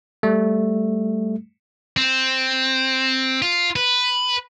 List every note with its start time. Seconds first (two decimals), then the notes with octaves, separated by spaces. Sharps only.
0.23 G3 A3
1.97 C4
3.42 F4
3.76 B4